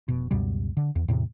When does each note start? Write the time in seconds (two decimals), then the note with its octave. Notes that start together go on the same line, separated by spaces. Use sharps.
0.08 F1 B2
0.31 C#2 F#2 B2 G3
0.77 D3
0.96 E2
1.08 E2 A2 C3